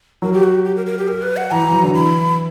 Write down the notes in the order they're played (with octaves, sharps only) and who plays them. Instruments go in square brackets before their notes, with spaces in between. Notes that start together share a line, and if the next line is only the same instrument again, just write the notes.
[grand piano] F#3 [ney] A#4
[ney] G4
F#4
G4
G4
A#4
A#4
G4
A#4
B4
F#5
[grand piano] E3 [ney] A#5
[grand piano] E3
F#3
D3
[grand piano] E3 [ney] B5